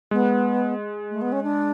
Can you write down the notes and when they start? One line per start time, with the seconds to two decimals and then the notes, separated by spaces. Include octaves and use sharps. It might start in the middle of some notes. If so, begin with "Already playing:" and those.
0.11 G#3 B3
1.10 A3
1.21 B3
1.31 C#4
1.43 D4